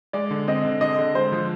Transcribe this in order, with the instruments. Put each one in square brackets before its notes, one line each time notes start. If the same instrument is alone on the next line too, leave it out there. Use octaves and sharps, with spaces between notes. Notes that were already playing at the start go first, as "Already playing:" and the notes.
[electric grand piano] G#3 [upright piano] D5
[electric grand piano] D3
[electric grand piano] C4 [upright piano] D#5
[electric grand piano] D3
[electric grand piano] D3 [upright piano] D#5
[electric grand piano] D3
[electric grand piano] G#3 [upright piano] C5
[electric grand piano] F3